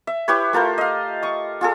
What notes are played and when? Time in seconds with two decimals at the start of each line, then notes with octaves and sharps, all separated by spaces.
0.07 E5
0.28 E4 G4 B4 C#5
0.53 A3 F4 A#4 C5
0.78 D#5 F5
1.23 C#6 D#6
1.61 F4 G#4 A4